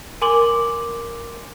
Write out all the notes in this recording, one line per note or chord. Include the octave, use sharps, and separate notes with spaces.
A#4 G#5 C6 D6 F#7